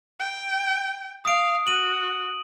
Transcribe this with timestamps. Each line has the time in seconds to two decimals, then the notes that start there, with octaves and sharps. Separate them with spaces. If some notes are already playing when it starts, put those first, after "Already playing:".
0.20 G5
1.25 F5 D#6 D7
1.67 F#4 D#7 F#7